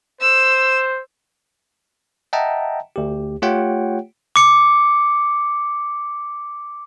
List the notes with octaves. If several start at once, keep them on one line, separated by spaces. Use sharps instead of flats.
C5 E6
D#5 E5 F#5 G5 A5 A#5
D2 G4
A3 F4 G4 C#5 F#5 G5
D6 C#7